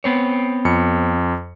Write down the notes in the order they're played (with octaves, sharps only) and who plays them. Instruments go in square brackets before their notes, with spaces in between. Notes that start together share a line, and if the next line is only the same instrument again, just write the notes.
[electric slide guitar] B3 C4 C#5
[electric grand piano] F2 C#7